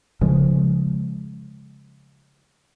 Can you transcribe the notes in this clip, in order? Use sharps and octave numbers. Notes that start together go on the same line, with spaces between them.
C#3 F3 G#3